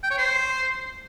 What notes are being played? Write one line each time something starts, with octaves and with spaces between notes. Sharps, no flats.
G5
C#5
C5